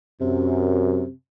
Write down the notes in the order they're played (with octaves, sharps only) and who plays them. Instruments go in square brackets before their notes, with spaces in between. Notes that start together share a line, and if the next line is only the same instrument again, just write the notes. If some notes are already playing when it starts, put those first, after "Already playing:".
[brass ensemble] F#2 [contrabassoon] C3